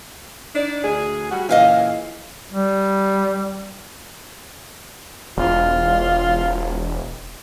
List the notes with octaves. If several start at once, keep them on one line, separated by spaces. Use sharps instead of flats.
D4 D#4 D5
D2 G#4
G3 F#4
A#2 C#3 E3 D#5 F5 G#5
G3
E1 F4